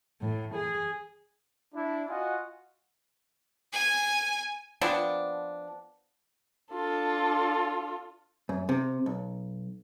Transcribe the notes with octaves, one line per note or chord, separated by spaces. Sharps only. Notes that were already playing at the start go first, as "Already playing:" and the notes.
A2
G#4
D4 E4
F4 F#4 D#5 F#5 G#5
G#5
F3 B3 C4 D4
D4 F4 A4
F#2
C3
B1